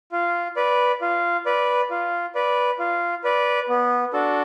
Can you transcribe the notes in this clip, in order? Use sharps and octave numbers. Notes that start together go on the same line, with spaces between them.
F4
B4 D5
F4
B4 D5
F4
B4 D5
F4
B4 D5
B3
D4 F#4 A4